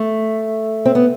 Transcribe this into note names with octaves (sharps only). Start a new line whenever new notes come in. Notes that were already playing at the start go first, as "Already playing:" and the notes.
Already playing: A3
C4
B3